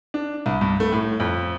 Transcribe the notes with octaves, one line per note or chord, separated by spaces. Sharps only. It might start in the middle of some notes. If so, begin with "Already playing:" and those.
D4
C2
G2
A3
A2
F2